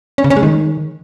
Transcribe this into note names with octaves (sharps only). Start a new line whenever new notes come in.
C#4
C#3
C#4
G#3
D#3